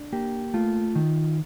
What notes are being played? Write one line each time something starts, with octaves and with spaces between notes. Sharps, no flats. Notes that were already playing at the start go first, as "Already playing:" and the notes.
Already playing: D4
A#3 G4
A3 F4
D#3